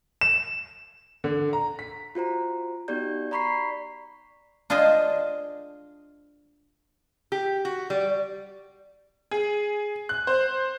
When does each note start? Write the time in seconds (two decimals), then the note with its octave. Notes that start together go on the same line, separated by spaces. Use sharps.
0.21 E7
1.24 D3
1.53 A#5
1.79 B6
2.15 F4 F#4 C5 A#5
2.88 B3 D#4 F#4 G4 D5 G6
3.31 D5 A#5 B5 C#6 B6 C7
4.70 D4 F4 G#4 C5 D#5
7.32 G4
7.65 F#4
7.90 G3
9.31 G#4
10.09 F#6
10.27 C5